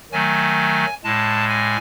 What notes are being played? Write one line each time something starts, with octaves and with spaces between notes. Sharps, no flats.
D#3 F#3 A3 G#5
A2 G#3 A5
G#5